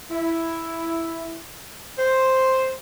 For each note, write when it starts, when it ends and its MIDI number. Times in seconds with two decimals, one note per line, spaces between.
0.11 1.38 64
1.99 2.73 72